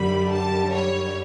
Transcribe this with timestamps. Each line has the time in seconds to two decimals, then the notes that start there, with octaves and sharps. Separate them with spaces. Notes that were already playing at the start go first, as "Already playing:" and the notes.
Already playing: F#2 D3 G3 B5
0.30 A5
0.73 C#5